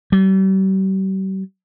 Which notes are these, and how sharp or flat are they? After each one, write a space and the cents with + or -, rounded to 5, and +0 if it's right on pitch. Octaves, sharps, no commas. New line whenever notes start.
G3 -40